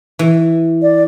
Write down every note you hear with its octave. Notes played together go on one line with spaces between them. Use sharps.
E3
D5